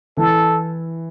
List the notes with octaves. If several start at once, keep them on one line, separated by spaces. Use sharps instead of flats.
E3 A4